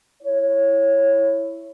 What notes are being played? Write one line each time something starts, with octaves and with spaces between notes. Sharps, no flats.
E4 C#5